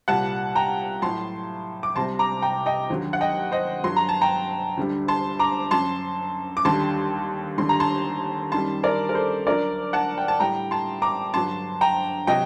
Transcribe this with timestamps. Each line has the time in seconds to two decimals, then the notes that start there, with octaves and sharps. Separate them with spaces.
0.08 C2 A#2 G3 F#5 A5
0.55 G5 A#5
1.02 A2 F#3 A5 C6
1.83 D6
1.96 C2 C3 G3 A5 C6
2.19 A#5 D6
2.42 G5 A#5
2.66 D#5 G5
2.90 D#2 D3 F#3
3.13 F#5
3.21 D#5 G5
3.52 C5 D#5
3.83 G2 F#3 C6
3.96 A#5
4.09 A5
4.21 G5 A#5
4.77 D2 D3 G3
5.08 A5 C6
5.39 A#5 D6
5.71 F#2 F#3 A5 C6
6.57 D6
6.65 D#2 D3 G3 A5 C6
7.58 D#2 D3 G3 C6
7.69 A#5
7.80 A5 C6
8.52 F#2 D#3 G3 A5 C6
8.83 A#4 D5
9.09 A#4
9.15 A4 C5
9.46 D2 D3 F#3 A#4 D5
9.93 F#5 A5
10.18 G5
10.28 A5
10.40 A2 G3 G5 A#5
10.71 A5 C6
11.02 A#5 D6
11.34 G2 D3 F#3 A5 C6
11.81 G5 A#5
12.27 C3 F#3 D#5 G5